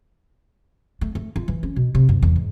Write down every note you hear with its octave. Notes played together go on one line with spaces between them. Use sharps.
A3
A3
F4
E3
C#4
B2
C3
F#2
E2
G#2